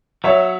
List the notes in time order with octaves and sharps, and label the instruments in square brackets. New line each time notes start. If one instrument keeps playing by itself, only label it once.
[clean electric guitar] F#3 [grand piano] C#5 E5